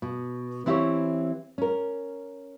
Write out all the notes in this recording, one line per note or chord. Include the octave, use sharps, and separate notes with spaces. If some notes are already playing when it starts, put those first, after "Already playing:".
B2
E3 C4 E4 F#4 G4 C#5
C#4 A#4